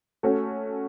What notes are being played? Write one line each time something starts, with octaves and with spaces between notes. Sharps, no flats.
A3 C#4 F#4 A4